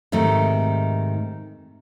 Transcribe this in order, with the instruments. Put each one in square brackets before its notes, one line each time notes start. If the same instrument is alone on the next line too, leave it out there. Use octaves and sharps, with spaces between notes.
[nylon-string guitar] G#2 C3 D#3 A3